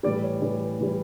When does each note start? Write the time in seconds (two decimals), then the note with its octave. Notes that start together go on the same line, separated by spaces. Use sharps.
0.03 A2 E3 G3 D5
0.22 C#5
0.41 A2 E3 G3 D5
0.79 A2 E3 G3